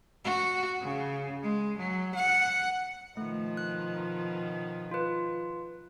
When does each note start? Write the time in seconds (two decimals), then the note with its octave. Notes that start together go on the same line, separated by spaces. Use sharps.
0.24 F#4
0.82 C#3
1.43 G#3
1.78 F#3
2.15 F#5
3.17 B2 D#3 F3 A3
3.57 F#6
4.91 F4 B4